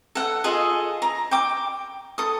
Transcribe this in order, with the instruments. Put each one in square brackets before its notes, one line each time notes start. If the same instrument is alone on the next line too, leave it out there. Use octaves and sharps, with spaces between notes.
[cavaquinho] A4 F#5
F4 G#4 A4 D#5
A#5
G5 D6
A4 D#6